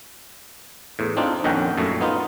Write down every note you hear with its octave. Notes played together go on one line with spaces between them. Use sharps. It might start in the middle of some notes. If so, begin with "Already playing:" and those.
E2 A2
C4 D4 D#4 F4
A#1 F2 D#3 C#4 F#5 G5
F#2 A#2 A3
B3 D#4 F4